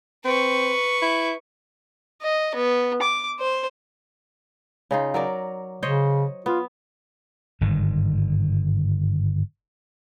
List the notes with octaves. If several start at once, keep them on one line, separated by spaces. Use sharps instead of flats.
C4 B4 C#6
E4
D#5
B3
D6
C5
C#3 D#4 F4
F#3 A#4 D5
C#3 C5 C#5 D#5
B3 F4
G1 G#2 D#3